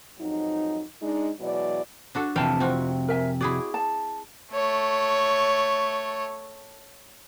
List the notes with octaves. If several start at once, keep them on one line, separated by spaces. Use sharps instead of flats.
F2 G#2 F#3 D#4
G#3 D4 D#4
B2 E3 F#3 G#3 D5
D4 F#4 A4
F2 C3 E3 C5 F5 G5 A5
C4 F4 F#4
A#4 E5 G#5
E4 F#4 G#4 D5
A5
A3 C#5